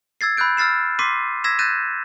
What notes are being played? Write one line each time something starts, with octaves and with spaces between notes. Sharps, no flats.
E6 G#6 A6 C7
B5 E6 F#6 G6 D7
E6 F6 A6 C7 E7
C6 D6 B6 C7 D#7
E6 G#6 A#6 B6 E7
F#6 G6 A6 A#6 D#7 E7